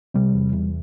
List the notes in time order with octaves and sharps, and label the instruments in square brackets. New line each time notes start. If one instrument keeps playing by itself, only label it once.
[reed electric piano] C3 [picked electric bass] G3
[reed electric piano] E2
E2